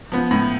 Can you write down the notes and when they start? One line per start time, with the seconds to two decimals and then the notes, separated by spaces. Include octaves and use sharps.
0.12 F3 B3
0.31 A2